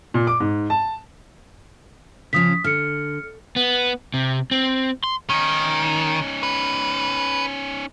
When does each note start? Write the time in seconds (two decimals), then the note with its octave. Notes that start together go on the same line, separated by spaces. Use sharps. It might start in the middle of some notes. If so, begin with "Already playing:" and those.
0.14 A#2
0.27 D6
0.40 G#2
0.70 A5
2.33 C#3 F3 C#4 D#6 B6
2.64 D3 F6 C#7
3.56 B3
4.14 C3
4.51 C4
5.04 C6
5.29 D#3 C#4 D#4
6.43 B4